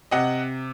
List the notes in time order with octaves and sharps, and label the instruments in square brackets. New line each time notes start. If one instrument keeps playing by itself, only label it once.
[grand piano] C3 D#5 F#5